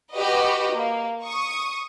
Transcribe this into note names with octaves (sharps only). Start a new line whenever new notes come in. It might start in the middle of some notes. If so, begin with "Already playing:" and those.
F#4 G4 B4 D#5
A#3
C#6 D#6